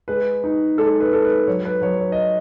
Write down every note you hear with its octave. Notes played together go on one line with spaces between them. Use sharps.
G#3 B4
D#4
G#3 A4
B4
G#3 A4
B4
F#3 C#5
B4
F#3 C#5
C#5
D#5